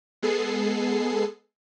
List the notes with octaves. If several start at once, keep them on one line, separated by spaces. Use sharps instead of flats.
G#3 B3 G#4 A4 C7